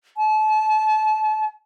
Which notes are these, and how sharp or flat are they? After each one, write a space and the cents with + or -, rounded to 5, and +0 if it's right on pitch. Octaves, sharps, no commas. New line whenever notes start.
A5 -30